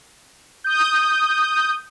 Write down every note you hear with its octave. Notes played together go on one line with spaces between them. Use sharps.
D#6 G6